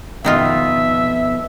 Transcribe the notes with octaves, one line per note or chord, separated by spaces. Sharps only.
F2 B2 D#3 B3 D#4 F4 E5